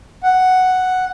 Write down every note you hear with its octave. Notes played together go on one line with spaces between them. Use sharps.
F#5